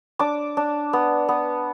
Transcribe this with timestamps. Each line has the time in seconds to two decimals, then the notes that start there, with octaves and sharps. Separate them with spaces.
0.19 D4 D6
0.57 D4
0.93 B3
1.29 B3